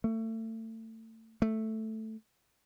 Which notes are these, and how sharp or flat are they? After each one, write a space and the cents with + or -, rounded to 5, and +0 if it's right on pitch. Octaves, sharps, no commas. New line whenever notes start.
A3 +30
A3 +0